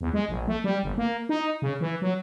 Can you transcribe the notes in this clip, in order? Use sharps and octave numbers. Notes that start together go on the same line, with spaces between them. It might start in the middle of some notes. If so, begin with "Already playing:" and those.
E2
G#3
A#1
A3
G3
G1
A#3
D#4
C#3
E3
F#3